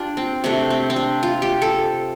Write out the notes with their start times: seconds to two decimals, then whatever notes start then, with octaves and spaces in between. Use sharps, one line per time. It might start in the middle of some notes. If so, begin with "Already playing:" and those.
Already playing: D4 F4 G4
0.17 C4
0.44 C3 A3 D4
0.70 C4
0.90 C4
0.96 D4
1.23 F4
1.42 G4
1.62 A4